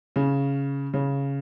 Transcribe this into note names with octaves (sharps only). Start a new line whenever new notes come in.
C#3 C#4
C#3 C#4